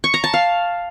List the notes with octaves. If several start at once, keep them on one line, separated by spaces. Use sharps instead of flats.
C#6
A#5
A5
F5